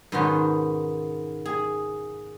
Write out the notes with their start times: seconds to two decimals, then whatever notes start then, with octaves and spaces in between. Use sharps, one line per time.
0.12 G#2 B2 D#3 C#4 F#5 C6
1.45 G#4